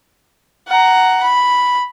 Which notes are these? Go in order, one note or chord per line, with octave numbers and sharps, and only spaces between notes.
F#5 A#5
B5